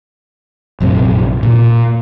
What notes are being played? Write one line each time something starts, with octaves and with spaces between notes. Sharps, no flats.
A#1 F#2 C3 C4
A#2